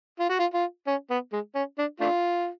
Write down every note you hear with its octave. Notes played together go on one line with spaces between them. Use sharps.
F4
F#4
F4
F4
C#4
B3
G#3
C#4
D4
A3 D4 F4